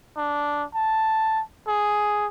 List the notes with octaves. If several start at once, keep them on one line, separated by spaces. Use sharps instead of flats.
D4
A5
G#4